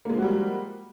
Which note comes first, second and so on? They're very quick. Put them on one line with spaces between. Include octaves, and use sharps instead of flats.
A#3 G#3 F3 F#4 G3